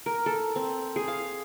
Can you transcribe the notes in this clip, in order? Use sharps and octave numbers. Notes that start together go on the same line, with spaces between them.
A#4
A4
C4
G#4
F5